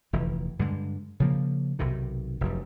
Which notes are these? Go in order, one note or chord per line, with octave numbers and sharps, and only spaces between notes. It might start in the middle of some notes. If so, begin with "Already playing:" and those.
F1 D2 E3
G2 D3 G#3
C#3 F3 A#3
B1 C3 D#3
F1 F#2